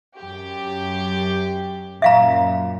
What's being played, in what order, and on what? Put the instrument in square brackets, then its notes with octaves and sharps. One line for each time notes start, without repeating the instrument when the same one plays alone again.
[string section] F#2 G4
[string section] F#2 A#2 [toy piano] E5 F5 A#5